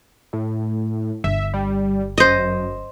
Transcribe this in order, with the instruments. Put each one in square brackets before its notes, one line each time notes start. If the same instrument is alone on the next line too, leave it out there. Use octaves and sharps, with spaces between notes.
[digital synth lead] A2
[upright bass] G1 [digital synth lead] E5
[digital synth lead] G3
[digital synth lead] F#2 [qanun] C5 D#5